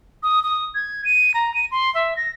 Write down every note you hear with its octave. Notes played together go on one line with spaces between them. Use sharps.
D#6
D#6
G#6
D#7
A#5
D#7
C6
E5
A#6